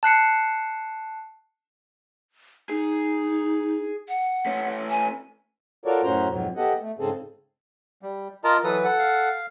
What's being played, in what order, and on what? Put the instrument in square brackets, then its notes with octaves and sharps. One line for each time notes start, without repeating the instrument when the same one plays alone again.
[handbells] A5 F#6 C7 C#7
[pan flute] D#4 [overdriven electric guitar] G#4
[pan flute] F#5
[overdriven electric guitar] A3 C#4
[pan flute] G#5
[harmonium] F4 F#4 A4 A#4 C#5 D5
F#2 A2 C#4 F#4 C5 A#5
F2 G#2 B2 F#3
B3 G4 A4 D#5 F#5
A3
G#2 C#3 C4 G#4 A4
[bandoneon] G3
[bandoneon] F4 A#4 [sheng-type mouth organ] D#5 A5 A#5
[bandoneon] E3 F#3 B4 [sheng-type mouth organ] A4 D#6
[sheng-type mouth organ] A4 F#5
[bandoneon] F5